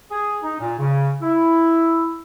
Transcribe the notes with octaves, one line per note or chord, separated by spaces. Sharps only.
G#4
D#4
A#2
C#3
E4